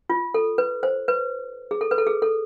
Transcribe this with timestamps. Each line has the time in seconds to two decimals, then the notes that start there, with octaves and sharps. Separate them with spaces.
0.10 F4
0.34 A4
0.58 B4
0.83 C5
1.08 B4
1.71 G#4
1.81 A4
1.91 B4
1.98 A4
2.07 G#4
2.22 A4